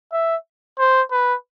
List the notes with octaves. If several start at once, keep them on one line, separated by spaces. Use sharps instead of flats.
E5
C5
B4